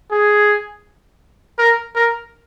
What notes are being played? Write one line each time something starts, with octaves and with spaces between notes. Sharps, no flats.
G#4
A#4
A#4